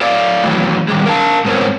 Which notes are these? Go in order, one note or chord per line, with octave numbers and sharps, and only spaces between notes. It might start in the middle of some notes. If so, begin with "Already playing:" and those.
A4 D5 F5
D#3 E3 F#3 A3
D#3 G3 G#3
A#4 F5 G#5 A5
G#2 B3 C4 A#4 C#5